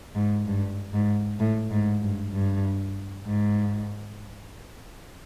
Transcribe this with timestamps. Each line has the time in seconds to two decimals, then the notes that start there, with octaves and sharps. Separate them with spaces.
0.15 G#2
0.46 G2
0.93 G#2
1.40 A2
1.71 G#2
2.02 G2
2.33 G2
3.26 G#2